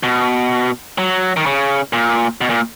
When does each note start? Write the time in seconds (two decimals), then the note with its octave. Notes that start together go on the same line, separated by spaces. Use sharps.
0.03 B2
0.98 F#3
1.37 D#3
1.46 C#3
1.93 A#2
2.41 B2
2.50 A#2